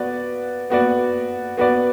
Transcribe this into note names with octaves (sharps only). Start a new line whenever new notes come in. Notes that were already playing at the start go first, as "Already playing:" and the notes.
Already playing: B3 F#4 B4 D5
B3 F#4 B4 D5
B3 F#4 B4 D5